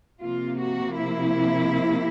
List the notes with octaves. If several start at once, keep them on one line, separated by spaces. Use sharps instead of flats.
C3 F3 A#3 F4
F#4
E4